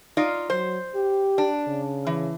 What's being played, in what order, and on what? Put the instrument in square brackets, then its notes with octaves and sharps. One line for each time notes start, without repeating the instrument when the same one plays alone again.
[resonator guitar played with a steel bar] D#4 F4 D5
[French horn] F#3 [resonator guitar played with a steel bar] C5
[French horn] G4
[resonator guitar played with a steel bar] D4
[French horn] C#3
[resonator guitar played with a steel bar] E3